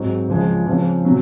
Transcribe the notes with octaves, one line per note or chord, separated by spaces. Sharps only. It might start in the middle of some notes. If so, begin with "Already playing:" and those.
Already playing: G#2 F#3 C4
C#2 C#3 F3 G#3
C#3 F3 C4
C3 F#3